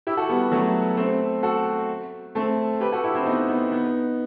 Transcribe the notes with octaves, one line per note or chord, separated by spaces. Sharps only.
E4 G4
F#4 A4
G3 B3
F#3 A3
A3 C4
F#4 A4
A3 C4
G4 B4
F#4 A4
E4 G4
C4 E4
B3 D#4
B3 D#4
B3 D#4